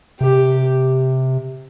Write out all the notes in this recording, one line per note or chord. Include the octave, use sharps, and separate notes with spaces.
C3 G4